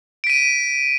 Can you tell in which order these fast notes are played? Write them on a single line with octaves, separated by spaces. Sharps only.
D7 B6 D#7